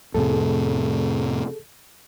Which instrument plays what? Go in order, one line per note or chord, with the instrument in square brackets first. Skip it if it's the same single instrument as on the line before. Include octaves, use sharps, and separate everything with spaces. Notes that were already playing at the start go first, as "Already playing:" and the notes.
[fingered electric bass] F2 A2 C3 [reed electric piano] G#4 A4